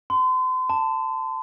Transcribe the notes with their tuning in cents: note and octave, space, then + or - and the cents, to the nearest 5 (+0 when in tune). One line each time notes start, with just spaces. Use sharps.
C6 -40
A5 +15